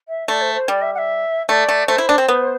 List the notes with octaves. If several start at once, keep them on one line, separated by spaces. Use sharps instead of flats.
E5
A3 D5
C5
C5
G3 D5
E5
F#5
E5
A3 D5
A3
A3 C5
E4
D4
C4
B3